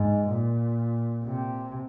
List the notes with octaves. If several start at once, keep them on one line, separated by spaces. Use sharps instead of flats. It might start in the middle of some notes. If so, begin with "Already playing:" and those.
Already playing: G#2
A#2
C3